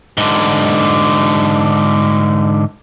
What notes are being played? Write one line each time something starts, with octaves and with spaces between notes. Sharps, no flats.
G#2 D3